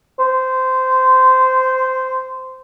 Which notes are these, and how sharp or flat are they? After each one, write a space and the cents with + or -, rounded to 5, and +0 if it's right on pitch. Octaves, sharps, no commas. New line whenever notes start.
C5 -15